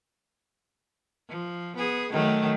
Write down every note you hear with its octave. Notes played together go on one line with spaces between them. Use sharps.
F3
B3 G#4
D#3 F#3 A3